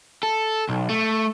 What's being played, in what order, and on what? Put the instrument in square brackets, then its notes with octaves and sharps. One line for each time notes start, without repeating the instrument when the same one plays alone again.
[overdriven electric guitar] A4
B1
A3